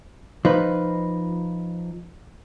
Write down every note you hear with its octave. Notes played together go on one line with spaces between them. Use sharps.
F3 D#4 B4